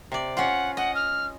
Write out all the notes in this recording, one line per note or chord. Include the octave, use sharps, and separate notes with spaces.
C3 D5
C#4 F4 F#5
D#5 F#5
F6